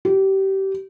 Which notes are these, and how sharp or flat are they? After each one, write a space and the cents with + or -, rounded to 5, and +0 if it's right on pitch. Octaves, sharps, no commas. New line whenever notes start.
G4 -25